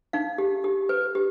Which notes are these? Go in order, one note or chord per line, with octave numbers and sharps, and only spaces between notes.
D#4 F5
G4
G4
B4
G4